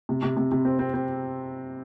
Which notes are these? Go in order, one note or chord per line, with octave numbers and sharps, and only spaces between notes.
C3
C3
C3
C3
C4
C4
C4